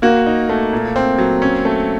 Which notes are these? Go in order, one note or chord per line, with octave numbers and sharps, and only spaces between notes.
A#3 F#4
D#4
A3
A#2
C4
F#3
C#4
A3